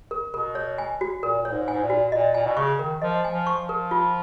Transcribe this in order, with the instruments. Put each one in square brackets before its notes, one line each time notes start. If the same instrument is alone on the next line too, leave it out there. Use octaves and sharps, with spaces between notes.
[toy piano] A#4
[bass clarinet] B2 [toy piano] A#4
[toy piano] C#5
G#5
F#4
[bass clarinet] A#2 [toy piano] A#4
[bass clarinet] A#2 [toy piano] C#5
[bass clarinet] G#2
[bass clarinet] G#2 [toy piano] G#5
[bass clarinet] A#2
[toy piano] F#4
[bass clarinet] A#2 [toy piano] D#5
[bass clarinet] A#2 [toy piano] G#5
[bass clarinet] B2
[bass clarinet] C#3 [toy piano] C#6
[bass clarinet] D#3 [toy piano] A#4
[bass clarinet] F3 [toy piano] D#5
[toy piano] G#5
[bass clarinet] F3
[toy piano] C#6
[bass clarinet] F3
[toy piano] A#4
F4